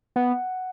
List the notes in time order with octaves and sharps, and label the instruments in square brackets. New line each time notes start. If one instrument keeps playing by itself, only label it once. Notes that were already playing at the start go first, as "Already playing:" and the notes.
[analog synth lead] B3 [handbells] F#5